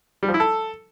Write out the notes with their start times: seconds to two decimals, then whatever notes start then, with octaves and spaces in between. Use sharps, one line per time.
0.23 G3
0.28 F3
0.34 E4
0.40 A4